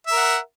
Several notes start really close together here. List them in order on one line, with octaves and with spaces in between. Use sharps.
E5 A#4 F#5